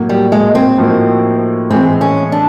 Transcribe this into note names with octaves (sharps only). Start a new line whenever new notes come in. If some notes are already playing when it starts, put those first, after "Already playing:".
Already playing: A2 F#3 A#3
G3
G#3
C4
A2 F3 A#3 D#4 F#4
A2 E3 G#3 C4
C#4
D4